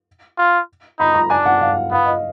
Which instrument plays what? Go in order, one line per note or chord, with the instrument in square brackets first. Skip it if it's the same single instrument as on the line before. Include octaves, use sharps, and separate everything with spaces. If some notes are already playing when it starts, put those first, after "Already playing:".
[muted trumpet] F4
[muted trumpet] D#4 [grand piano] B5
[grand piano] A#5
[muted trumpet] D4 [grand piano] G#5
[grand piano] F#5
F5
[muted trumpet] B3 [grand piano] F5
[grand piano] D#5